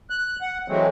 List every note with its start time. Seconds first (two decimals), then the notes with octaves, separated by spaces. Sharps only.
0.10 F#6
0.41 F#5
0.68 E3 F#3 G#3 A3 C4